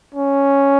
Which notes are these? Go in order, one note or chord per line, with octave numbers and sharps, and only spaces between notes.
C#4